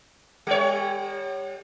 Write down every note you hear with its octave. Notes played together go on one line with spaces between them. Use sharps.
G3 C#5